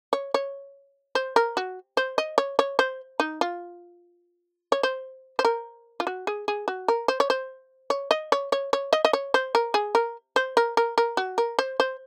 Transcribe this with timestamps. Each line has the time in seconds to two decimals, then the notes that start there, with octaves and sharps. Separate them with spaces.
0.13 C#5
0.34 C#5
1.15 C5
1.36 A#4
1.57 F#4
1.97 C5
2.18 D#5
2.38 C#5
2.59 C#5
2.79 C5
3.20 D#4
3.41 F4
4.72 C#5
4.83 C5
5.39 C5
5.45 A#4
6.00 F4
6.07 F#4
6.27 G#4
6.48 G#4
6.68 F#4
6.88 A#4
7.08 C5
7.20 C#5
7.30 C5
7.90 C#5
8.11 D#5
8.32 C#5
8.52 C#5
8.73 C#5
8.93 D#5
9.05 D#5
9.13 C#5
9.34 C5
9.55 A#4
9.74 G#4
9.95 A#4
10.36 C5
10.57 A#4
10.77 A#4
10.98 A#4
11.17 F#4
11.38 A#4
11.59 C5
11.80 C5